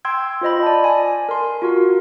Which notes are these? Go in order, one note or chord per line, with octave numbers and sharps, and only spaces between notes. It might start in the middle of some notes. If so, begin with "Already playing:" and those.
G5 C6 E6 G#6
F4 C5 D#5 B5
D5 A5
G#5
A#4 C6
F4 F#4 A#4